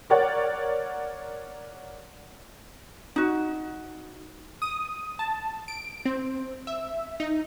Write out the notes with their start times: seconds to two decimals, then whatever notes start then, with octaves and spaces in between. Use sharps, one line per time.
0.10 A#4 C#5 D5 F#5
3.16 D#4 F#4
4.62 D#6
5.19 A5
5.68 D7
6.05 C4
6.67 E5
7.20 D#4